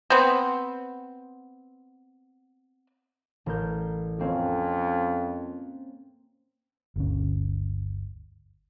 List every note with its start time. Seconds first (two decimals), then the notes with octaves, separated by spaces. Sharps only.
0.10 B3 C4
3.46 A1 A#4 G6
4.19 F2 A#3 C4 C#4
6.96 G1 D2 C#4